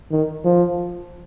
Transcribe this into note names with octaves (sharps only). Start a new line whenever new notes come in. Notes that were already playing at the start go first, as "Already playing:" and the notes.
D#3
F3